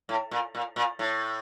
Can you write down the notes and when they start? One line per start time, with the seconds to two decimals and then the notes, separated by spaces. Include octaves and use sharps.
0.09 A2
0.31 A#2
0.55 A#2
0.76 A#2
0.99 A2